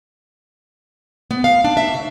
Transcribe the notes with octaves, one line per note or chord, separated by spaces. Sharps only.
B3
F5
D4
E5
C#3